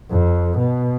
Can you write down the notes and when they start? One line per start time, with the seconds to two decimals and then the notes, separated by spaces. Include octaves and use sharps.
0.11 F2
0.58 B2